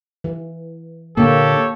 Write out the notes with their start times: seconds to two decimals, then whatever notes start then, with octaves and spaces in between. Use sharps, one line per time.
0.24 E3
1.17 A#2 D3 A#3 G4 A4 C#5